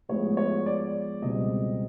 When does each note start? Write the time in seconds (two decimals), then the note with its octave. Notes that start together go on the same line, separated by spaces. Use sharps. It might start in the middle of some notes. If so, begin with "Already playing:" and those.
0.09 A2 F3 G#3 B3 C#5
0.37 C#5
0.66 D5
1.22 C#2 B2 G3 C4 D#5